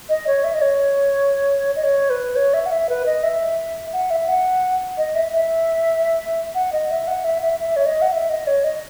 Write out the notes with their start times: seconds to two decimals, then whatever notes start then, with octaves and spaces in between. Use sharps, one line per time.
0.09 D#5
0.27 C#5
0.44 E5
0.54 D#5
0.61 C#5
1.76 D#5
1.84 C#5
2.10 B4
2.36 C#5
2.54 E5
2.66 F#5
2.71 E5
2.89 B4
3.06 D#5
3.23 E5
3.93 F#5
4.10 E5
4.29 F#5
4.98 D#5
5.15 E5
5.33 E5
6.55 F#5
6.72 D#5
6.90 E5
7.07 F#5
7.24 E5
7.42 E5
7.59 E5
7.76 C#5
7.86 D#5
8.02 F#5
8.12 E5
8.29 D#5
8.47 C#5
8.64 D#5